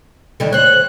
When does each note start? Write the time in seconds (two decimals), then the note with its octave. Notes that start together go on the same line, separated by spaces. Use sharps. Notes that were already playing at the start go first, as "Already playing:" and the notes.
0.40 D3 D#3 G3
0.53 C5 C#5 F#6